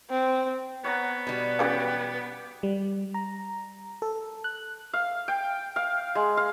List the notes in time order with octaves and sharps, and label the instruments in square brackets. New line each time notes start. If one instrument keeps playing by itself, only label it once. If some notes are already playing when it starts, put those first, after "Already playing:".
[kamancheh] C4
[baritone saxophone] B3 [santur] C#5 F#5 A#5
[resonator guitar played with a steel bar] B2 G3
[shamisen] C#3 E3 F#3 [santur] G4 B4 D5
[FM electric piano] G3
A#5
A4
F#6
[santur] F5
G5
F5
G#3
F5